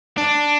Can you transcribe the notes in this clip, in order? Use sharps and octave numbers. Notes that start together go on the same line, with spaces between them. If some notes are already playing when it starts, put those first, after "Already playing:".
D4